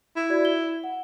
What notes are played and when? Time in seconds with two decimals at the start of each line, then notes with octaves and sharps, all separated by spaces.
0.16 E4
0.30 F#4 D5 G#6
0.45 G7
0.84 F#5